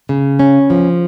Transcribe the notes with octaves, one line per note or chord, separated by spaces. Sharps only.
C#3
C#4
F3